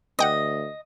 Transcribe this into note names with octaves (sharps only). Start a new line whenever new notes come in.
D2 D#5 F#5 G5 A#6